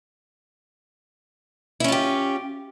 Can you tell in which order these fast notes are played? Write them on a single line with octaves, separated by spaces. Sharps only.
E4 C#4 F4 G4